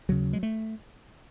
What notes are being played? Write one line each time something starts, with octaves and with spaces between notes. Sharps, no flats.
D#2 C#3 F#3
G#3
A3